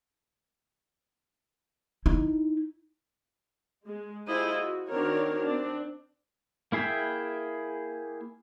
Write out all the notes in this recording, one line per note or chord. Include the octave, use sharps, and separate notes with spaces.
D#4 E4
G#3
E4 F4 G4 G#4 C5 D#5
F#4
D#3 C4 D4 F#4 A#4 C#5
C4 D4
A#3 E4 G#4 E5 G5